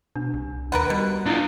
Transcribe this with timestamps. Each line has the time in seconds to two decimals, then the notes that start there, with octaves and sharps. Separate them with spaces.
0.16 B2 D4
0.34 C2
0.72 D#2 A#4 B4 F#5
0.90 B2 G3
1.26 D4 E4 F4